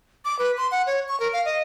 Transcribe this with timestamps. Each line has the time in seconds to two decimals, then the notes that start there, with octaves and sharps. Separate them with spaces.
0.25 D6
0.39 B4
0.58 C6
0.72 F#5
0.87 C#5
1.08 C#6
1.20 A#4
1.33 F5
1.45 D#5